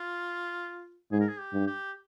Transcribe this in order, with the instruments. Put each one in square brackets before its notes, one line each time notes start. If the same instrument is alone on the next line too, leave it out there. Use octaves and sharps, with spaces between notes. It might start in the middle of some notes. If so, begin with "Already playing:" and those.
Already playing: [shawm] F4
[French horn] G#2 [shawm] G#4
[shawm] A#4
G#4
G4
[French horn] G2
[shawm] G4